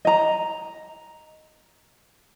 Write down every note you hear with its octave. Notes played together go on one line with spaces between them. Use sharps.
D#5 A#5